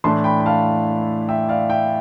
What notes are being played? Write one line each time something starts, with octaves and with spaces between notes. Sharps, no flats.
A2 E3 A3 D4 A5 C6
G5 B5
B5
F5 A5
E5 G5
D5 F5
E5 G5